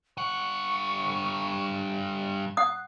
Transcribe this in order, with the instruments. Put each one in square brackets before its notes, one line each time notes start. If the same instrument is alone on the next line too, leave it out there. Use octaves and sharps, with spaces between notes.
[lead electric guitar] G2 F#5 [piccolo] C#6
[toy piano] F#5 D#6 [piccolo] F#6